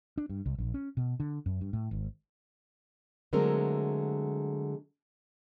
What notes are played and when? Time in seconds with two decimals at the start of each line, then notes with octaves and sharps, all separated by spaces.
0.18 D4
0.29 G2
0.46 C2
0.58 A#1
0.74 C#4
0.97 B2
1.20 D3
1.46 F#2
1.61 G2
1.73 A2
1.91 G#1
3.33 D3 F#3 G#3 A3 C4 A#4